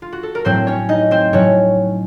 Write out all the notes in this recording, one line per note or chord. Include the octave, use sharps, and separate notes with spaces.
F4
F#4
A4
A#4
A2 F#3 C4 C5
C#4 C#5
D#4 D#5
C4 C5
A2 F#3 C#4 C#5